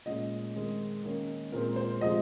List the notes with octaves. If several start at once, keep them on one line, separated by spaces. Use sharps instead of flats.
A#2 G#3 C#4 D#5
D#3 G#3 C4
D#3 A#3 C#4
A#2 G#3 C4 A#4
C5
C3 F3 G#3 D#5